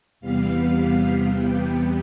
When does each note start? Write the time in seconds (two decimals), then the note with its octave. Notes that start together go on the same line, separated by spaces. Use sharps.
0.20 E2 C3 G3 B3 F5
1.29 G5